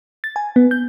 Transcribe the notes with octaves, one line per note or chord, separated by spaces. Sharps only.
A6
G#5
B3
G6